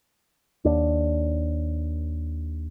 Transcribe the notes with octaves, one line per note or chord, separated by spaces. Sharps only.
D#2 D4